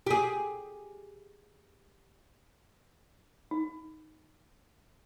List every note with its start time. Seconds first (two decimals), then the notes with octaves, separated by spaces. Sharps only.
0.07 G4 G#4
3.51 D#4